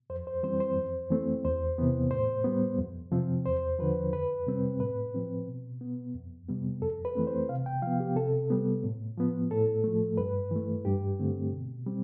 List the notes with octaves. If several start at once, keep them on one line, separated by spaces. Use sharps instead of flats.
F2 C5
C5
E3 G3 C4 C5
C5
F2
E3 A3 C4
E2 C5
C3 E3 B3
A2 C5
G3 B3
F2
C3 F3 C4
E2 C5
D3 F3 B4
F2 B4
C3 G3 C4
A2 B4
F3 C4
B2
B3
F2
C3 G3 B3
F2 A4
B4
E3 A3 C4
C5
C3 F5
G5
F3 B3 F5
G4
C3 A4
G3 B3
A2
F3 B3
A2 A4
F3 A3
G2 B4
E3 A3
G2 G4
D3 A3 C4
B2
G3 C4